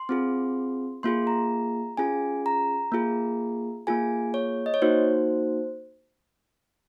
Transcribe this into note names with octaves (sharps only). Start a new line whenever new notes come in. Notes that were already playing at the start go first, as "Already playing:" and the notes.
Already playing: C6
C4 F4 G#4
A#3 F4 G#4 C6
A#5
C#4 F4 G#4 G#5
A#5
A#3 F4 G#4
A#3 F4 G#4 G#5
C#5
D#5
C#5
A#3 D#4 F#4 C5